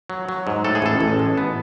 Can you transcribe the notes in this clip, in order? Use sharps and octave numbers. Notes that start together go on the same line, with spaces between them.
F#3
F#3
G#2
A2 A4
G#4
A1 A4
A1
G#3
B3